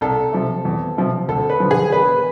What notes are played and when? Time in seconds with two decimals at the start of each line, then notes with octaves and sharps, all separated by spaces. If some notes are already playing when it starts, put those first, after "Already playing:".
0.01 C2 A4
0.33 C3 F3
0.65 E2
0.98 C3 F3
1.28 D2 A4
1.50 B4
1.60 D3 F3
1.71 G#4
1.92 E1 B4